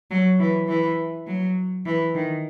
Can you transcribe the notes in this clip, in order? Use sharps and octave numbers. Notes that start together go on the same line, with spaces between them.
F#3
E3
E3
F#3
E3
D#3